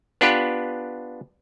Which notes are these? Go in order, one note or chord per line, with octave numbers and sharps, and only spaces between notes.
B3 D4 F4 G4 B4